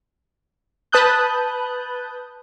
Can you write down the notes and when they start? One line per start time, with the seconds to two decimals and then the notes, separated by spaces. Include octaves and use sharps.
0.92 B4 A5 D#6 F#6 G6